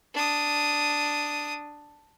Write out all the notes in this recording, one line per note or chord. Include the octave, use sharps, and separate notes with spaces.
D4 D#6